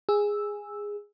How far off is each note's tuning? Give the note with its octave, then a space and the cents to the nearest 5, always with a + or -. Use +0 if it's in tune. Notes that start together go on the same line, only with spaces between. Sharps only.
G#4 -10 E6 -5